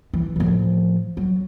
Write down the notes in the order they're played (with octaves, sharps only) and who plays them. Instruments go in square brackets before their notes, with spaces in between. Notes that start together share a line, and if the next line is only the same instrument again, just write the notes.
[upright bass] E3
A2 F3
F#3